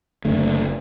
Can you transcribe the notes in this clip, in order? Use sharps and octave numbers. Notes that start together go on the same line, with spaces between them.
F#1 D3 A3